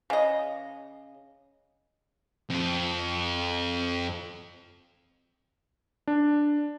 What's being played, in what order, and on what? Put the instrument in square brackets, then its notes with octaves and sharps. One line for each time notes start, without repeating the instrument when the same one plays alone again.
[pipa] C#3 D#5
[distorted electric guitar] F2 F4
[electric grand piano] D4